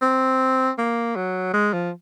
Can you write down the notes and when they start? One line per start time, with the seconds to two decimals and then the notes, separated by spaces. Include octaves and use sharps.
0.02 C4
0.78 A#3
1.16 F#3
1.54 G#3
1.73 F3